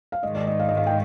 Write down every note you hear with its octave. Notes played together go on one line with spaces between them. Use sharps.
F5
G#2 D#3 G#3 D#5
D5
D#5
F5
D#5
F5
G5